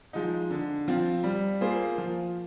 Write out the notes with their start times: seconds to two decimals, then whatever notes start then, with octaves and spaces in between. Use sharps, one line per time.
0.13 F3 G#3 D#4
0.51 D3
0.88 F3 C4 F4
1.24 G3
1.61 A#3 F4 G#4 C5
1.98 F3